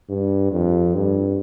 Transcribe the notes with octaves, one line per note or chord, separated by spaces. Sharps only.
G2
F2
G2